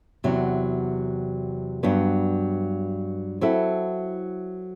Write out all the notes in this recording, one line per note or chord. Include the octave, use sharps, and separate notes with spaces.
E2 C3 F#3
G2 F#3 B3 D4
F#3 C4 E4 A4